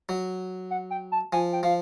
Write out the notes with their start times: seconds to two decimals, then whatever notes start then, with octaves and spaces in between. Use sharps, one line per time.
0.09 F#3
0.71 F#5
0.91 G5
1.12 A5
1.32 F3 G#5
1.53 G5
1.63 F3 F5